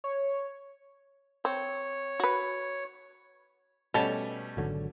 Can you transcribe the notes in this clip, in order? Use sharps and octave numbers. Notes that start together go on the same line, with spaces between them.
C#5
C4 C#5
F#4 B4
B2 G3 A3 C#4 C#5 A5
G#1 D3 F#3